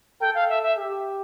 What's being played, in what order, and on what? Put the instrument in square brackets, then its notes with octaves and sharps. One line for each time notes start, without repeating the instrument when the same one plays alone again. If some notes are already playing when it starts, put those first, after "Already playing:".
[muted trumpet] A4 [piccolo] G5
[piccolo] F5
E5
E5
[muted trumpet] G4